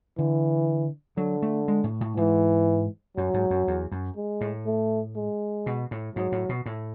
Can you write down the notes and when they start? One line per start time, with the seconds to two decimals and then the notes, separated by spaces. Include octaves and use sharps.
0.18 D3 E3
1.17 D3 F#3
1.42 A3
1.68 G#3
1.84 A2
2.01 A2
2.17 G#2 E3
3.17 F#2 F#3
3.34 G#2
3.50 F#2
3.67 E2
3.92 F#2
4.16 G#3
4.41 A2
4.66 A3
5.16 G#3
5.66 B2
5.91 A2
6.16 G#2 F#3
6.32 A2
6.49 B2
6.66 A2